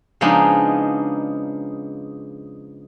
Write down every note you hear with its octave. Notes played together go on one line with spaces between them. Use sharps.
C#3 F3 G#3 B3 D4 D#4